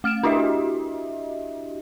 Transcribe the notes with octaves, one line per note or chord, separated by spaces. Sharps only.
A3 F6 D7 E7
D4 E4 F#4 G4 D#5 E5